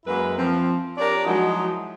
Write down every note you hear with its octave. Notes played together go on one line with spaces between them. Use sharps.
F#2 G#3 A#3 E4 B4
F3 C4
D4 G4 A#4 C#5 D5
F3 F#3 G#3 D#4 E4 F#4